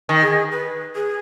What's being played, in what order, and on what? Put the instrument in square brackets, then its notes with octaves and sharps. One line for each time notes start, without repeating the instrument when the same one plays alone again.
[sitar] D#3
[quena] G#4
B4
G#4